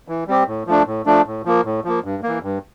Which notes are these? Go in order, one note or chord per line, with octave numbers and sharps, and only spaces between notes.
E3
G3 C4 G4
A2
F3 A3 D4
A2
F3 A3 D4
A2
F3 A#3
A2
F3 A#3
G2
E3 A#3
G2